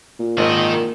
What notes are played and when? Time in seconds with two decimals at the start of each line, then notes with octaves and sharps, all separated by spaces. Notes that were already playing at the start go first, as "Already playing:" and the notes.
0.20 A#2
0.37 G#1 D#3 A#4 D#5